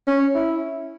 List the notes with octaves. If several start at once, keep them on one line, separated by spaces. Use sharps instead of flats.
C#4
E4